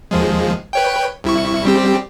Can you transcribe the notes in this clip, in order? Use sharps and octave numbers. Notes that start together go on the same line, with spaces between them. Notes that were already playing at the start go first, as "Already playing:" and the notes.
D#2 F3 G#3
B4 C#5 G5
C2 E4 C#6
G3 C4 G4